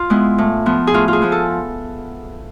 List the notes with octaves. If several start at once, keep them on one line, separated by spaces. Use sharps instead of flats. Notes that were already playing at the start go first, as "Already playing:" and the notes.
Already playing: F4
G#3 B3 E4
A2
F3 B3
G#4
A2 F4
F4
G#4
F3 B3
A4